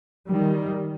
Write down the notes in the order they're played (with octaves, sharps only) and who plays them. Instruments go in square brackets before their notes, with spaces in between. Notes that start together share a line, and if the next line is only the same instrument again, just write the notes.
[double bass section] D#3 G3